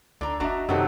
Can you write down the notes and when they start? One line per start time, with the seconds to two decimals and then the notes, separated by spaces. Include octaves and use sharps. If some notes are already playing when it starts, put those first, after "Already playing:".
0.21 C#2 D3 D4 A#5
0.40 F#1 D4 F#4 D#5 E5 A#5
0.69 F#2 C3 D#3 F#3 D#4 F#4 G4 A4